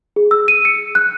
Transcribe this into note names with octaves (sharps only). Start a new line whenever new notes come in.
G#4
E6
D#7
C#7
F#6